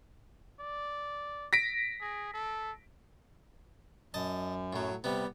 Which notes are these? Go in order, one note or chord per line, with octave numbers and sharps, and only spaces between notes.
D5
A#6 B6 D7
G#4
A4
F#2 D#5 A5
A2 F#3
C3 G3 B3